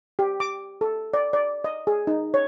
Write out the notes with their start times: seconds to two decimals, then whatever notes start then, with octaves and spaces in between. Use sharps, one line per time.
0.19 G4
0.40 D6
0.81 A4
1.14 D5
1.33 D5
1.64 D#5
1.87 G#4
2.07 D#4
2.34 C#5